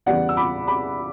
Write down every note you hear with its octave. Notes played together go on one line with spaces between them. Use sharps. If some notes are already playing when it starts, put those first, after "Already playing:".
E2 C#3 G3 B3 D5 F#5
E6
B5 D6
B5 D6